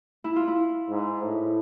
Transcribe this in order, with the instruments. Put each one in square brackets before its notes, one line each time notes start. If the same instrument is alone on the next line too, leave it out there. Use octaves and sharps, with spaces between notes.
[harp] E4
F4
E4
[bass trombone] G#2
A2